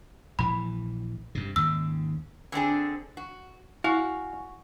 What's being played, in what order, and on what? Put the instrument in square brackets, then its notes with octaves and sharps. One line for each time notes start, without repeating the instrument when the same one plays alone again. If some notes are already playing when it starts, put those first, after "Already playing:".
[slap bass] A#1 E3 [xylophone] B5
[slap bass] G2 C3
[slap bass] D#2 G#2 C#3 [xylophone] E6
[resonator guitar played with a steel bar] D3 C4 D4 G#4
F#4
[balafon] E4 [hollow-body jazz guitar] F#4 [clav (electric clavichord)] F5 [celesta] G#5 C#6